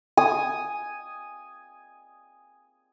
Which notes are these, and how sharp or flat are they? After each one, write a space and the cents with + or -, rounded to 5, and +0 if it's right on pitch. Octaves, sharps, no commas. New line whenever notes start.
G#5 +0 D#6 +0